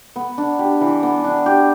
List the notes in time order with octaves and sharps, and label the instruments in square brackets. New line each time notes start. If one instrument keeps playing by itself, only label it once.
[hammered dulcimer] B3
D4
G4
E3
B3
D4
G4